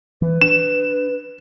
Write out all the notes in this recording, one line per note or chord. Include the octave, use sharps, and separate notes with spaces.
E3 B4
D4 E7